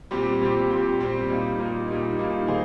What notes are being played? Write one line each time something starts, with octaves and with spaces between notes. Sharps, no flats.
A#2 G3 C4 G4
A#2 G3 C4 G4
A#2 G3 C4 G4
A#2 G3 C4 G4
A#2 G3 A#3 D#4
A#2 G3 A#3 D#4
A#2 G3 A#3 D#4
A#2 G3 A#3 D#4
D#3 A#3 D#4 G#4 C5